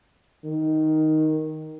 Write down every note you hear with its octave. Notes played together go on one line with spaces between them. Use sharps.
D#3